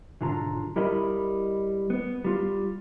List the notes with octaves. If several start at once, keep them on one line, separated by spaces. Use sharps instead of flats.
B1 G#2 D3 F4 A#5
G3 E4 A#4 D#5 B5
B3
G3 F4